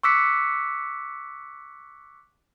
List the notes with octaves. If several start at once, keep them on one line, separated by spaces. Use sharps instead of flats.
C#6 D6 E6 F#6 B6 C#7